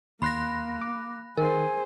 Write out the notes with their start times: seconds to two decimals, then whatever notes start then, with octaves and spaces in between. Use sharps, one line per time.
0.22 D#2 A#3 B5 C6 F#6 A#6
0.81 D6
1.37 D#3 G#4 A#4 C5 G#5